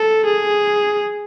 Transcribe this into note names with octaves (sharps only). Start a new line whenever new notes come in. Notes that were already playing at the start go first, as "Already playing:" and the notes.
Already playing: A4
G#4